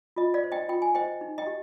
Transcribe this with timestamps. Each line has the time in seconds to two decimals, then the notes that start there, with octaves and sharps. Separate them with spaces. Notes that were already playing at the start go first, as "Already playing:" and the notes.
0.16 F4 D#5
0.34 D5 F5
0.44 C5
0.52 D#5 G5
0.69 F4 G5
0.82 G#5
0.95 C5 D#5 G5
1.21 D#4
1.38 D#5 G5
1.47 G4